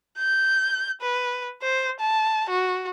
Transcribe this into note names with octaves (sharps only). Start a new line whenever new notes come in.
G6
B4
C5
A5
F#4